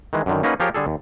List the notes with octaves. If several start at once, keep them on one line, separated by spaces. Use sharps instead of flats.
D#3 E3 G#3
F#2 D3 D#3
A#3 C#4 D#4 F#4 B4
F3 F4 G4 G#4 A#4 C#5
D3 G3 G#4 A4
D#2